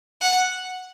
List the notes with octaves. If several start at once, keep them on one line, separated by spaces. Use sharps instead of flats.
F#5